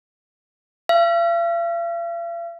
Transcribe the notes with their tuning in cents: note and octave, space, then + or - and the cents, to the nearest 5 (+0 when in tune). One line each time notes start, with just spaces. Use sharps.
F5 -45